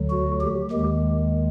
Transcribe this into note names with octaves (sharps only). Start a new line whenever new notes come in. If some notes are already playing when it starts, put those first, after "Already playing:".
Already playing: D2 D3 F#3
F#4
G4
D#2 D#3 G#3